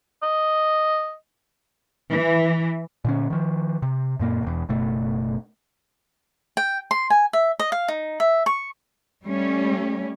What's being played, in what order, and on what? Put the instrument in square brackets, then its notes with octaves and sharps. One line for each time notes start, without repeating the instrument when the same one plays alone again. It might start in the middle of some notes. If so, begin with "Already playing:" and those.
[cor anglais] D#5
[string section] E3
[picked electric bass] A#2 D3 C#4
D#3 F3
C3
F#2 A#2 A#3
E1 E2
F#1 B2 A3
[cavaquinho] G5
C6
G#5
E5
D#5
F5
D#4
E5
C#6
[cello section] G3 A3 C#4